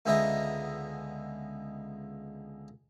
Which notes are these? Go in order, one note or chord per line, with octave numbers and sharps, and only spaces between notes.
C#2 D3 G#3 B3 E5 A#5